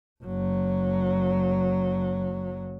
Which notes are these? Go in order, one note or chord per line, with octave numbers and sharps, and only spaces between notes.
F#1 F#3